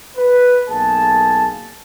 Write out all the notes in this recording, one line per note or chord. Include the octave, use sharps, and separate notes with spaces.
B4
B1 A#3 G#4 A5